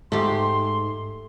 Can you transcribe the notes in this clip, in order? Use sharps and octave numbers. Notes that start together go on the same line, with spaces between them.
G#2 A3 G4 C6